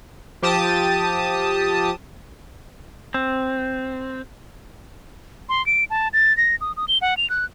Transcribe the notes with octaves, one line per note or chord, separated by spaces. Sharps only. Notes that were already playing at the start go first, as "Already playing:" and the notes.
F3 G4 A5 D#6
C4
C6
D7
A5
A6
A#6
D#6
D#6
G7
F#5
F7
F#6